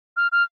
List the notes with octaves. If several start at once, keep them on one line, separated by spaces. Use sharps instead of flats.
F6
F6